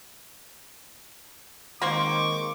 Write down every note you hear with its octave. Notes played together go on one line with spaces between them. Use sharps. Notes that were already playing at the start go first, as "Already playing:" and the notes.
D#3 G#3 A#3 C4 C5 C#6 D6